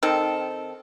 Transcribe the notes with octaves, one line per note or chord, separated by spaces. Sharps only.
D#3 C4 A4